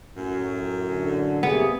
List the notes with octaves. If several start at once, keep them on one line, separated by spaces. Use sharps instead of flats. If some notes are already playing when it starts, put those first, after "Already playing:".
F#2 A2
D3
C3 A#3 B3 G#4